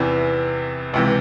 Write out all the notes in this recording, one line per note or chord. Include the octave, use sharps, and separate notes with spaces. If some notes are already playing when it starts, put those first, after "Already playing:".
Already playing: E2 C3 E3
C#2 C3 E3